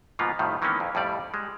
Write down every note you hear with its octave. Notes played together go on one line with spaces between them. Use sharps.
G#2 B2 F3 A#3 B3 F4
F2 A2 D#3 F3 G3
D#3 E3 G#3 A#3 B3 C#4
F2
F2 A2 G3 D5
G3 G#3